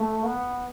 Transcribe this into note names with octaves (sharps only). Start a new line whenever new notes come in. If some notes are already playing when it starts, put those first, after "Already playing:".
Already playing: A3
B3